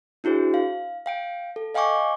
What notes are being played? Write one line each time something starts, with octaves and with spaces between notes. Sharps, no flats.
D4 E4 F#4 G#4 C5
F5
F5 G5 D7
A4
D#5 F5 G5 G#5 C#6 D6